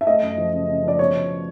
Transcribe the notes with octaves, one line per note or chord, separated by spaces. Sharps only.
E5
A3 D#5
F#2
F3
C#3
C#3
F3 D5
B2 C#5
B2